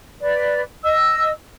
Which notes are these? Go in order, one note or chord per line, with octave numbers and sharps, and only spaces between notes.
B4 D5
D#5 E6